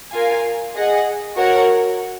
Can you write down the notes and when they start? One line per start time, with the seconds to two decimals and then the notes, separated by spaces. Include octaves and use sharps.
0.12 F4 A#4 F5 G#5
0.74 G#4 D#5 F#5
1.36 F#4 A#4 C#5 F#5